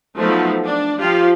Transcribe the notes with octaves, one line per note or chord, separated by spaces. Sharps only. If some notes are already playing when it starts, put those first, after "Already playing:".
F3 F#3 A3 B3 D#4
D4
F3 F4 G4